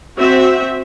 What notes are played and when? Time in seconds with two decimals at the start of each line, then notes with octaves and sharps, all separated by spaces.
0.15 C4 F#4 E5